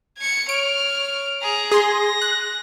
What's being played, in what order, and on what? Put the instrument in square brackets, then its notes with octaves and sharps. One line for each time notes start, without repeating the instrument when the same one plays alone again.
[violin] G#6 C#7
[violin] C#5 F6 [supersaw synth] D7
[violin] G#4 A#5
[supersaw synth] G#4 C6 [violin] A#6
[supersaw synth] F#6